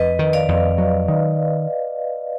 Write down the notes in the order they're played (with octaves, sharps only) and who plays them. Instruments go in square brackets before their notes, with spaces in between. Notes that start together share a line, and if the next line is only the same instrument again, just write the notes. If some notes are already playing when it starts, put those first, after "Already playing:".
Already playing: [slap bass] F2 [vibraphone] B4 D#5
[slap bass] D#3
[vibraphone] D5 F5
[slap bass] F2
F#3
D#3